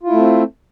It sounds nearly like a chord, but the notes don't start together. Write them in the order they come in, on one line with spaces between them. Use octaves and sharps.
F4 E4 A3 C4